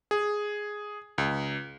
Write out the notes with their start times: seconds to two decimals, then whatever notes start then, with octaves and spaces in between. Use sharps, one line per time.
0.11 G#4
1.18 C#2